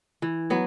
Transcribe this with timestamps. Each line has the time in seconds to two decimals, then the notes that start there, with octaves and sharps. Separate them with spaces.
0.22 E3
0.50 F#3 B3